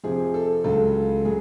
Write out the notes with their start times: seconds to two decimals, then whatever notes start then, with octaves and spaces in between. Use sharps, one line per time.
0.04 F2 C3 F3 G#4
0.34 A4
0.64 C#2 C#3 F#3 A4
1.25 F#3 G#4